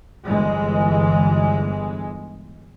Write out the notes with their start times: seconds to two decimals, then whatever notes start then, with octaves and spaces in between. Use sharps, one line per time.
0.26 G1 E3 G#3